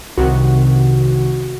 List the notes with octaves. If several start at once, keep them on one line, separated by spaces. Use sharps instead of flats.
C2 C3 D#3 F#4